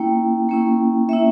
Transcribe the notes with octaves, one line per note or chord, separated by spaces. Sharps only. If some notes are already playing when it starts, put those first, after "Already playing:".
Already playing: A#3 C#4 E4 G5
A#3 C#4 E4
A#3 C#4 E4 E5